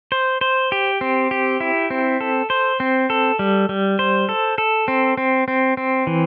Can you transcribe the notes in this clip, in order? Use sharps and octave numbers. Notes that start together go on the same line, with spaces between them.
C5
C5
G4
C4
G4
E4
C4
A4
C5
C4
A4
G3
G3
C5
A4
A4
C4
C4
C4
C4
E3